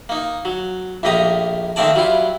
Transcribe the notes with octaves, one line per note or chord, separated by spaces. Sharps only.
A#3 D#4
F#3
A#1 A2 A#3 G4 D#5 A#5
D#3 A3 A#3 C4 D5 A5
F#3 G3 E4 F4